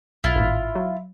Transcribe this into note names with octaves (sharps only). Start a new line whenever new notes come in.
B1 E4 F4
G#1 A2
F#3